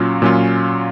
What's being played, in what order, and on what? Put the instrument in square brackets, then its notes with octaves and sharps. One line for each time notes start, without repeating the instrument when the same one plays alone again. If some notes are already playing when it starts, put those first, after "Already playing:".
Already playing: [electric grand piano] A#2 F#3 C#4 F4
A#2 F#3 C#4 F4